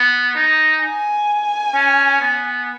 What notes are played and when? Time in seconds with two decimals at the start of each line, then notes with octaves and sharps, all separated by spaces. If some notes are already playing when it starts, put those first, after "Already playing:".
Already playing: B3
0.35 D#4
0.82 G#5
1.75 C#4
2.21 B3